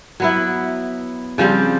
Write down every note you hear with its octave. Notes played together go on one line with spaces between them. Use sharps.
F#3 B3 E4
C#3 F3 G3 C4